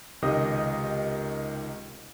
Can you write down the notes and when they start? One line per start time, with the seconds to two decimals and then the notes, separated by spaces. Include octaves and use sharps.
0.22 C#2 C3 D#3 G4 D#5 D#6